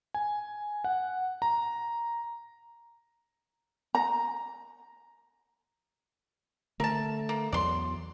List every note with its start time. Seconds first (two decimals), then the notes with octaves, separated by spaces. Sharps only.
0.14 G#5
0.84 F#5
1.42 A#5
3.95 A#5
6.80 D3 A3 A#4 A5
7.29 A#3
7.53 E2 F#3 D5 C6